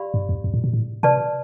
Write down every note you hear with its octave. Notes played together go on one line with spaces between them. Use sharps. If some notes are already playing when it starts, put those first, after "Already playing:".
Already playing: G4 D5 F5 B5
G2
F2
F2
A2
B2
A2
C3 B4 D5 A5